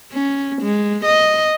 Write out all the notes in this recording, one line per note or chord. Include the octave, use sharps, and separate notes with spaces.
C#4
G#3
D#5